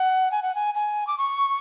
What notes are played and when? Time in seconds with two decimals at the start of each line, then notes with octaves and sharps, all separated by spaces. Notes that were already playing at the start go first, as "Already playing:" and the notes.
Already playing: F#5
0.31 G#5
0.43 F#5
0.55 G#5
0.75 G#5
1.07 D6
1.18 C#6